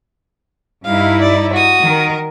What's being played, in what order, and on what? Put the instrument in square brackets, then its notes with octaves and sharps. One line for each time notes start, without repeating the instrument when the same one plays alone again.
[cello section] G2 D#4 E4 [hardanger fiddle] F5
[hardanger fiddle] D5
F#4 D#6
[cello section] D#3 A#4 D#5